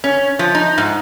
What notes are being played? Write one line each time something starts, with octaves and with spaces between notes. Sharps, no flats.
C#4
F3
D#4
G#2